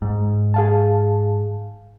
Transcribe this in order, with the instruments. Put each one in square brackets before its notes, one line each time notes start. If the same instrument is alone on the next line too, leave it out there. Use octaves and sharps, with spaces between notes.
[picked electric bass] G#2
[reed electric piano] G#4 F5 A5